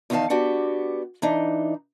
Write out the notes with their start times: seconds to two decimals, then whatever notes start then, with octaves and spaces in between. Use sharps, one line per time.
0.10 E2 D#3 D#4 G#4 F5 A5
0.30 B3 D4 F#4 G4
1.22 E3 D4 D#4